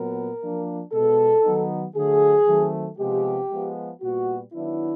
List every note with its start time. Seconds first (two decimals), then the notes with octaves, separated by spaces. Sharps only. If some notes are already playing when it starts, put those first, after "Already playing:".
Already playing: A#2 F#3 B3 A#4
0.41 F3 A#3 D4
0.92 B2 G#3 B3 A4
1.43 D#3 F#3 B3 D#4
1.95 D3 F#3 A3 G#4
2.47 D#3 F#3 A3 C4
2.98 C3 F3 G#3 B3 G4
3.50 F3 G#3 B3
4.01 A#2 G3 B3 F#4
4.53 D#3 F#3 B3 D4 E4